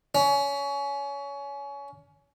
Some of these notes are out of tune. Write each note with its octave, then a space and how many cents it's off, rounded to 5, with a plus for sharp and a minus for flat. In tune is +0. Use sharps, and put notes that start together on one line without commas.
C#4 +25